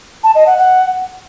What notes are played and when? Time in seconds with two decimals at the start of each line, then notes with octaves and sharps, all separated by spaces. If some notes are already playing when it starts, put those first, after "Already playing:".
0.24 A5
0.35 D#5
0.46 F#5
0.58 F#5